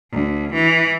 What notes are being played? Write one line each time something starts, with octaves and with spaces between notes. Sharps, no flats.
D2
E3